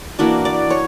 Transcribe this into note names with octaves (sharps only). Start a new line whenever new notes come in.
E3 A#3 D4 F#4
D5
C#5